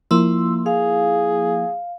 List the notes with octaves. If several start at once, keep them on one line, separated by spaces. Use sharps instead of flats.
F3 A#3 E4 C6 E6
G#4 F5